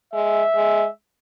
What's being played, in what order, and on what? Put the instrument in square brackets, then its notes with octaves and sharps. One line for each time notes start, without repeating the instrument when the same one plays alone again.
[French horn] G#3 [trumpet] E5
[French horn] G#3